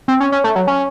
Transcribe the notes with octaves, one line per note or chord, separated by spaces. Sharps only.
C4
C#4
C#4
A3
F#3
C#4